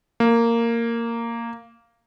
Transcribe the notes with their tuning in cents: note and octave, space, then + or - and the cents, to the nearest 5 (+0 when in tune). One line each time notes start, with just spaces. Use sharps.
A#3 -10